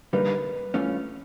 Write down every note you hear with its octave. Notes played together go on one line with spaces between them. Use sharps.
D3 G3 A#3 D#4 B4
G2 E3 A3 C#4 F4